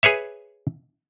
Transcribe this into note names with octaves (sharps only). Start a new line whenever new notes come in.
G#4 B4 C#5 E5